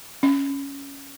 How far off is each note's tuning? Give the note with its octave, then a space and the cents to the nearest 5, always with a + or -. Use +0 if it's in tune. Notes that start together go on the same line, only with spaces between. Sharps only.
C#4 +5